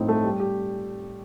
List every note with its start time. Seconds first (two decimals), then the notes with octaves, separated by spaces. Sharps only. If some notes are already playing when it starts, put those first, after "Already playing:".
Already playing: A2 F3 C4 D#4
0.08 A3
0.24 G3
0.40 G4